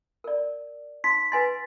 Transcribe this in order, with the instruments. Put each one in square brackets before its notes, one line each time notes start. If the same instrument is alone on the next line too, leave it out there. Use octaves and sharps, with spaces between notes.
[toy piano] A#4 D5
[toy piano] D#4 [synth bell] C6 B6
[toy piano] B4 G#5 C6 [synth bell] A6